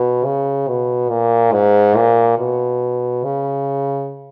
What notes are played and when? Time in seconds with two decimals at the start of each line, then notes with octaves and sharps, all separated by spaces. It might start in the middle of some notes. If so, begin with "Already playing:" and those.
Already playing: B2
0.24 C#3
0.68 B2
1.10 A#2
1.52 G#2
1.96 A#2
2.38 B2
3.24 C#3